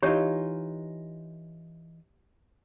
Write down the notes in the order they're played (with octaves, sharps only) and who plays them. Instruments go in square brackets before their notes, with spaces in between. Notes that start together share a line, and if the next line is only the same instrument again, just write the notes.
[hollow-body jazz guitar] E3 D#4 F4 [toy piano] G4 C#5